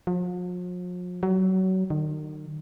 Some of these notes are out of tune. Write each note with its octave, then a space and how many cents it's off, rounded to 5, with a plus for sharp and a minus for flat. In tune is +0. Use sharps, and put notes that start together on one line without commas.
F3 +45
F#3 +25
D#3 -35